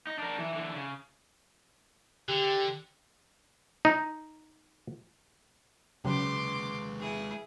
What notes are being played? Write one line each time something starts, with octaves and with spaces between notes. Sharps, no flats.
D#4
D4 A#4
E3
D3 E3
C#3
D3 G4
D#4
C#3 F#3 G#3 B4 C6 D6
E4 G#4